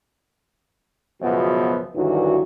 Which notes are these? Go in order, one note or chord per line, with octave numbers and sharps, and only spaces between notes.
C#2 F#2 B2 F3 B3
D2 G2 D#3 E3 F#3 F#4